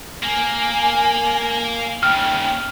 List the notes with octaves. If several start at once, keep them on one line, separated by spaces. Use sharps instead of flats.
A#3 G#5
D#2 C#3 G5 F6